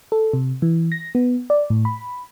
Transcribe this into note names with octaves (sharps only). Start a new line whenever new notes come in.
A4
C3
E3
A#6
B3
D5
A2
B5